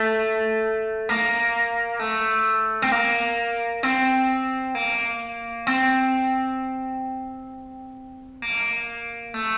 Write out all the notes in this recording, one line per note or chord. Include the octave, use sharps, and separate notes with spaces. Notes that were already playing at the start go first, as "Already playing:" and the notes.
Already playing: A3
A#3
A3
C4
A#3
C4
A#3
C4
A#3
A3